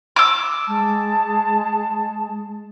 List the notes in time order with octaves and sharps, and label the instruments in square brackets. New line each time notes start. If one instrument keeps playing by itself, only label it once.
[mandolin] D6 E6
[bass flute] G#3 [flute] A5